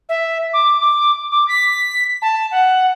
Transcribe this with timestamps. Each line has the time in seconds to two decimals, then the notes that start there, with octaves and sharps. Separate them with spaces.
0.09 E5
0.53 D6
0.80 D6
1.31 D6
1.48 B6
2.22 A5
2.51 F#5